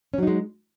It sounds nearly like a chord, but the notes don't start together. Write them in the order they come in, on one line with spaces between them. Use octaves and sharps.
C#4 F#3 D#4 G#3